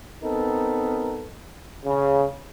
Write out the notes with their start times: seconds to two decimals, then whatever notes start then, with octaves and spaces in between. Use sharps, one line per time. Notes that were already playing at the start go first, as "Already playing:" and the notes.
0.23 B3 C4 D#4 A4 A#4
1.85 C#3